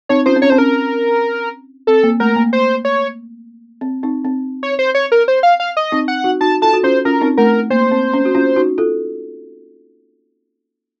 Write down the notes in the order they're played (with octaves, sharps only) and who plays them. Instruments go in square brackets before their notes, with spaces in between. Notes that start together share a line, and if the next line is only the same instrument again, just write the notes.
[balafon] C4 D#4 [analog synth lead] C#5
[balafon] C#4 F4 [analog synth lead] C5
[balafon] C4
[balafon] C#4 [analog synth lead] C#5
[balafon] C4 [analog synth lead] C5
[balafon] C#4 [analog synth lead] A#4
[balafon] C4 [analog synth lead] A4
[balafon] A#3
[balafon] A3 [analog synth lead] A#4
[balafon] A#3
[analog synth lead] C5
C#5
[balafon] C4
C4 D#4
C4
[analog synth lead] C#5
C5
C#5
A#4
C5
F5
F5
D#5
[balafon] C4 D#4
[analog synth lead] F#5
[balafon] D#4 F#4
[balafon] D#4 F#4 [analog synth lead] A5
[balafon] F4 A4 [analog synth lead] A5
[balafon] F#4
[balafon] C#4 F4 [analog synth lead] C5
[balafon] C#4 F4 [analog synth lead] A#4
[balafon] C4 D#4
[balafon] A3 [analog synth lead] A#4
[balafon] A#3 [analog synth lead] C5
[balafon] C4
C#4
F#4
C#4 F4
D#4 F#4
F4 A4